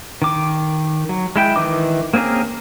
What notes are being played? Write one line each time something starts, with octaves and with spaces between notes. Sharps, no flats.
D#3 D6
F#3
G#3 E4 G5
D#3 E3 D#5 D6
A#3 C4 C#4 G#4 A#4